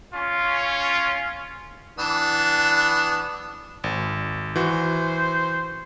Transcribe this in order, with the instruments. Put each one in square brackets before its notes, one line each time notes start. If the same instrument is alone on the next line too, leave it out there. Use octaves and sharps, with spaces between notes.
[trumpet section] C#4 F4
[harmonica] E3 B3 D4
[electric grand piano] G#1
[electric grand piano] E3 F#4 [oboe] C5